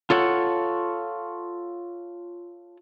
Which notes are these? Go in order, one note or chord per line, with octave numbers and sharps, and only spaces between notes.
F4 A4 C#5 F#5